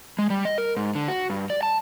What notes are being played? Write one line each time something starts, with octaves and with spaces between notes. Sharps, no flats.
G#3
G3
D#5
A#4
G#2
D3
F#4
G2
D5
A5